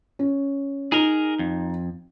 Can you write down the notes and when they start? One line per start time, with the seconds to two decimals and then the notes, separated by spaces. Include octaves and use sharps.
0.19 C#4
0.92 D#4 G#4 A#4
1.39 F2